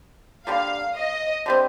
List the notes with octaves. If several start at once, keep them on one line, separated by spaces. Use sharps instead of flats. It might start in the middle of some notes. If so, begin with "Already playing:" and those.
D3 G3 A#3 F5
D#5
D3 G3 C4